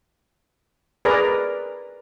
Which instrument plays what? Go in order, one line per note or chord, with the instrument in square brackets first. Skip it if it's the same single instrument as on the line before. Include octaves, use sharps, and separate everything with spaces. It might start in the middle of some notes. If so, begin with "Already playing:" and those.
[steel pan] G#4 A#4 B4 D5 A#5